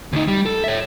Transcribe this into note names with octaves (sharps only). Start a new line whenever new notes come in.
D2 D#4
G3
A4
C#5 E5